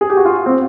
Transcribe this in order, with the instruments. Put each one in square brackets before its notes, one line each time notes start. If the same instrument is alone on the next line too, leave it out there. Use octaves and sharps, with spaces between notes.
[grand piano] G#4
G4
F#4
F4
C4